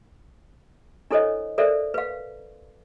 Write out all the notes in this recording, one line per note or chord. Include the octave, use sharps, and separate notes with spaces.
D4 E4 A4 C5 C#5 D#5
A4 A#4 C5 D5 E5
B4 F5